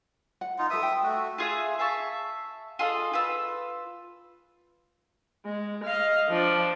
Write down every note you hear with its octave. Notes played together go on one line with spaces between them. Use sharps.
F#5
D#4 F4
A4 B4 E5 D#6
G5
A3 F#4
F4 G#4 E5
E5 F5 A5 C#6
F4 G#4 A4 D#5
F4 B4 E6
G#3
D#5 F5
F3 D4